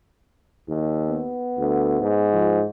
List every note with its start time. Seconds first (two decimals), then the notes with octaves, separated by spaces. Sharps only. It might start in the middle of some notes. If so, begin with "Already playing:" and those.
0.68 D#2
1.09 B3
1.58 D2
2.01 G#2
2.33 F3